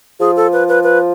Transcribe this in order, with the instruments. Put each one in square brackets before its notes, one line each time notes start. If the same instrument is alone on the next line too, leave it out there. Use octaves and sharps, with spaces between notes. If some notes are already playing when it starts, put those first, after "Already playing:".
[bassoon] F3 [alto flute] G#4
[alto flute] A4
B4
B4
B4